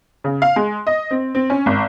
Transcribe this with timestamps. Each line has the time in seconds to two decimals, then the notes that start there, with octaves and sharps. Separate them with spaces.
0.24 C#3
0.42 F5
0.56 G#3
0.87 D#5
1.11 C4
1.35 C4
1.50 C#4
1.66 G#1